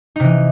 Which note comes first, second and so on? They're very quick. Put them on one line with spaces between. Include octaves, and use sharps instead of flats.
D#4 C3 E3